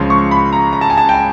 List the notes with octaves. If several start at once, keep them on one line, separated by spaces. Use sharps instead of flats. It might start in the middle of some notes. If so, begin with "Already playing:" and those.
Already playing: C#2 C#3 F3 C6
C#6
B5
A#5
A#5
A5
G#5
A5
G5
G#5